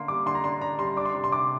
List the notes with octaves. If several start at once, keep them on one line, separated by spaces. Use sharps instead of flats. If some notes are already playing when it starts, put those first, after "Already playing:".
Already playing: D3 A#3 D4 C6
G3 D6
D3 C6
A#5
D4 C6
D4 A#5
G3 C6
D4 D6
C6
C3
C6
C3 D6